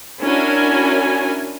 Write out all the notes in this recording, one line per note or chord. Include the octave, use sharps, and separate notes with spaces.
C#4 D4 E4 F#4 A#4 G#5